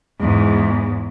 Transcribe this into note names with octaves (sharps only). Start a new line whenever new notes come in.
E2 G#2